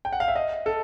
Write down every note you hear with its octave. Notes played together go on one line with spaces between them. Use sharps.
G5
F#5
F5
E5
D#5
A4